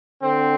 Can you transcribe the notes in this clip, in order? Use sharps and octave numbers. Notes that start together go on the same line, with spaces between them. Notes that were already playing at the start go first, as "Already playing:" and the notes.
D3 C4